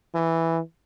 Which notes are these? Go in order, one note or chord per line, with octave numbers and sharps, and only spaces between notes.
E3